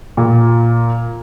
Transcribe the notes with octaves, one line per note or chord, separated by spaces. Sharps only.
A#2